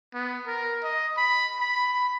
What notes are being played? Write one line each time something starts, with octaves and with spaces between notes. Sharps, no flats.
B3
A#4
D#5
B5
B5